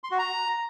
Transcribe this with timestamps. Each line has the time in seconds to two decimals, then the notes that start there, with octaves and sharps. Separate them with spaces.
0.04 C6
0.11 F#4
0.19 A#5